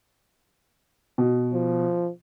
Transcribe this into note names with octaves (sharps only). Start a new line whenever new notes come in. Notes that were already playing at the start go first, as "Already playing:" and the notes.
B2
F3